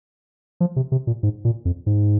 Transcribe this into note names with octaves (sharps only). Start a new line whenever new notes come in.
F3
C3
C3
A#2
G#2
A#2
F2
G#2